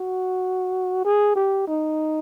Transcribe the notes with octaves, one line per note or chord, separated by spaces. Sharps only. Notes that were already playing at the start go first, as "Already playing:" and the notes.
Already playing: F#4
G#4
G4
D#4